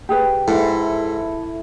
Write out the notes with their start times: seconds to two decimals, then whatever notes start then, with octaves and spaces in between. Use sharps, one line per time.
0.09 G4 G#4 B4
0.48 G#2 E4 A4